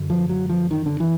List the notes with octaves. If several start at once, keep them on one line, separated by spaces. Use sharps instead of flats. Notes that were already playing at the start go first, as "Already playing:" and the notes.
Already playing: F#2 D3
F3
F#3
F3
D#3
D3
E3